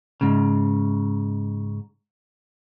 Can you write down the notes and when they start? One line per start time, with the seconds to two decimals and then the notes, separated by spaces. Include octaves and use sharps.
0.21 G#2 C#3